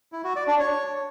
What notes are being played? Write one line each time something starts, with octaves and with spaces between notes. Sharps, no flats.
E4
F#4
D5
D4
C#5